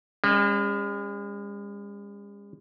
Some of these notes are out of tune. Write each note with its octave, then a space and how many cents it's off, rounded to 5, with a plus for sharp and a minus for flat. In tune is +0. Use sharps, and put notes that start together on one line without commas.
G#3 -45 C#4 +0